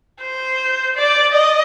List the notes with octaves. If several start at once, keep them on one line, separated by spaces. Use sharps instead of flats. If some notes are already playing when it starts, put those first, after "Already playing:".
C5
D5
D#5